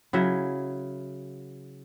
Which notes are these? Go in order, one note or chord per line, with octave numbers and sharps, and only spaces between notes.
C#3 F#3 E4 E5